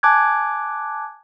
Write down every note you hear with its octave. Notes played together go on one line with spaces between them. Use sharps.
G#5 A5 D6 F#6 G#6